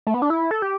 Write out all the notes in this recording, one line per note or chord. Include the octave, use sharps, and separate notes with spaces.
A3
B3
D4
E4
A4
G4